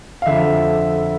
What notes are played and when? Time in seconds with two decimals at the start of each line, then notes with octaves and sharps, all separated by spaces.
0.22 F5
0.26 F2 D3 E5